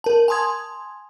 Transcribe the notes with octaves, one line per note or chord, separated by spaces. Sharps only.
A#4 A5
G#5 A5 C6 D#6 G#6